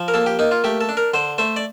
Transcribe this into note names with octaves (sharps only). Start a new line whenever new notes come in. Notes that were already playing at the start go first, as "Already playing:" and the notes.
Already playing: F3
A#4
A#3 A4
G4
A#3 D#4
F4
A3 G4
A4
D4
A#4
D3 C5
A3 C5
D5